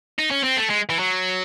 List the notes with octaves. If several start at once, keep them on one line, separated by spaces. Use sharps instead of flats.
D#4
C#4
C4
A3
G#3
E3
F#3